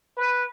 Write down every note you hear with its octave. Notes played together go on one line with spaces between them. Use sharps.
B4